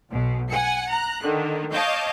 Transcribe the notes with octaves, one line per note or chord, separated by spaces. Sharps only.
B1 B2
F#5 G#5 C#7
A#5 F#6
D3 D#3
C#5 D#5 F5 A5 D6 G6